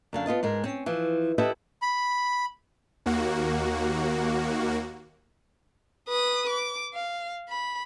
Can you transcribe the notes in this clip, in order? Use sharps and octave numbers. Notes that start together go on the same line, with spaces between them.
F#2 D3 F5
B3 F4 D#5 A5
G#2 G#3 A#4
C4 C#4
E3 F3
E4 G4 A4 B4 D#5 E5
B5
D#2 A#3 F#4
B4 D#6
D6
F5
B5